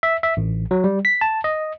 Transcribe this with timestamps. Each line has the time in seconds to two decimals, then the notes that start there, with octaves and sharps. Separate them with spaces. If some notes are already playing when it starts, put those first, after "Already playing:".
0.03 E5
0.23 E5
0.37 A1
0.71 F#3
0.84 G3
1.05 B6
1.21 A5
1.44 D#5